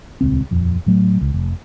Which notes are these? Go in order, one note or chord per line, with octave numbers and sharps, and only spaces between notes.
D#1 C#2 C4
D#1 F2
A2 F#3 A3
C#2
F1